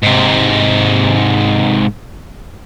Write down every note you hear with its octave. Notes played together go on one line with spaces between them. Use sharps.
G#2 C3